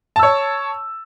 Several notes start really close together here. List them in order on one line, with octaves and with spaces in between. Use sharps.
A5 E6 C#5